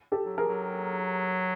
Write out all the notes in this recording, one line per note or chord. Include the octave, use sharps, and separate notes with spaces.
G4 A4
F#3
F3 G#4 A#4
F#3